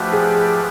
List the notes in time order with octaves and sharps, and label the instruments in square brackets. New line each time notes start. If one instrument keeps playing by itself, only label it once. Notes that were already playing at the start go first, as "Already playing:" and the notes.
Already playing: [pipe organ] F3 A3 D4 G4 B4 [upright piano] F#4
[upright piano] G#4